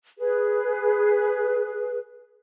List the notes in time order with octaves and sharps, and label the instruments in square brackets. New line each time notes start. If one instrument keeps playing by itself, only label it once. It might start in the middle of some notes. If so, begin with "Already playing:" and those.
[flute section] G#4 B4